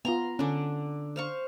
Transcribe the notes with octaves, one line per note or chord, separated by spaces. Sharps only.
B3 F4 A#5 C6
D3 C#4 D4
C5 F5 C#6